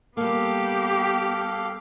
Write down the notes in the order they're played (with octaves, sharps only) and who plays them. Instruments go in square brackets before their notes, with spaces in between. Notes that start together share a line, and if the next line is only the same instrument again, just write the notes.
[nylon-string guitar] G3 A#3 [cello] B3 G4 [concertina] A4 F5 D6